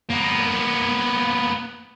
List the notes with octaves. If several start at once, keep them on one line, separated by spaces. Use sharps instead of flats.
A#3 B3